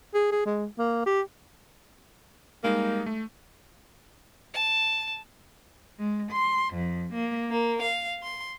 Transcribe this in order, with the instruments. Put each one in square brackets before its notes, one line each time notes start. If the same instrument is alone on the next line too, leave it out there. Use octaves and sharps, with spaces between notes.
[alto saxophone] G#4
G#4
G#3
A#3
G4
[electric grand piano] G3 G#3 D#4 [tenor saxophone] A#3
[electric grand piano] A3
[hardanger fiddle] A5
[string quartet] G#3
C6
F2
A#3
A#3
F5
C6